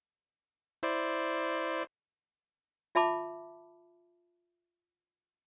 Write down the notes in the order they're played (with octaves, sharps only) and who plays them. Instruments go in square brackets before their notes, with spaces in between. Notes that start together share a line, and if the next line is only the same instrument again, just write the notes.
[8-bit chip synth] E4 C5 D5
[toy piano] F4 E5 A5 B5 D6